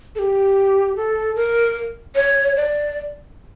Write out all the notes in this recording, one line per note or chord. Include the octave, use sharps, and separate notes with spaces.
A4
G4
A4
A#4
C#5
D5